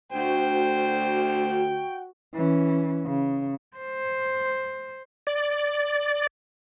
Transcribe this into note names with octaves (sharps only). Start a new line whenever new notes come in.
D2 F#4 C5 G5
E3 C#4
C#3
C5
D5